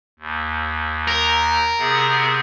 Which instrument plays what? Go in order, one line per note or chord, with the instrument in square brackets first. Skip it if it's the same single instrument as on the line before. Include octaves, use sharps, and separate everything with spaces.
[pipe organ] D#2
[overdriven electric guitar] A#4
[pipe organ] C3 B3 G#4